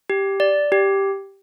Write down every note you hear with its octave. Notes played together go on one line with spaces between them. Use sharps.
G4
D5
G4